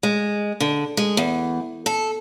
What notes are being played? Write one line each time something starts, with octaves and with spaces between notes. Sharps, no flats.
G#3
D3
G#3
E2
A4